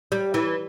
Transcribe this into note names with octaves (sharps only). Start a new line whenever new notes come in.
G3
E3